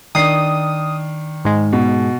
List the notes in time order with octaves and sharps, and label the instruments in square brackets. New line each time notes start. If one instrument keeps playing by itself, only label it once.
[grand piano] D#3 D4 C7 [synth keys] D#6
[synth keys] G#2 G#3
[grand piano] B2